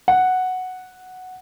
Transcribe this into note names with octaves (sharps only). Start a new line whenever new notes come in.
F#5